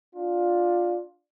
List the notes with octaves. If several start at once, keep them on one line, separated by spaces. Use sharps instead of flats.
D4 F4